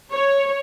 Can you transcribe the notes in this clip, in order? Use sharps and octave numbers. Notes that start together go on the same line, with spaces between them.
C#5